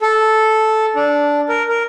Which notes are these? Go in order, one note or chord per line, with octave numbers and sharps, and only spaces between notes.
A4
D4
A#4
A#4